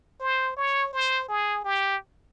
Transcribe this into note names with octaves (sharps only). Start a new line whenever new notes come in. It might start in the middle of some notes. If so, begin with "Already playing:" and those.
C5
C#5
C5
G#4
G4